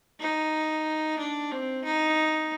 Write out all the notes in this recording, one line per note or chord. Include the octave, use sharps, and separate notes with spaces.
D#4
D4
C4
D#4